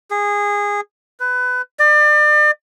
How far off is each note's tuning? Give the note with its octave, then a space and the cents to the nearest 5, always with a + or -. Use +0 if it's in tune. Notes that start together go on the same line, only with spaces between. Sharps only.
G#4 -20
B4 +20
D5 +35